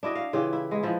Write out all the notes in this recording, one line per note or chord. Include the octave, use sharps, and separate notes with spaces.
D4 E4 F#4 D#5
F5
C#3 E3 F4 G4
E4
G#3 B3
E3 F3 E4